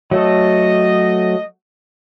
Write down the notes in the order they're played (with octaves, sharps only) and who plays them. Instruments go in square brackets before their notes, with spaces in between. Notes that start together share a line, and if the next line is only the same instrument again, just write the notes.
[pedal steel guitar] F#3 A3 A4 [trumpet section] D#5